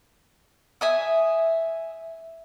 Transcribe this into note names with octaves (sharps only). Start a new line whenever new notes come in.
E5 G#5 D#6